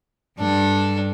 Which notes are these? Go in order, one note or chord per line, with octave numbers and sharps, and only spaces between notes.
G2 D4 A4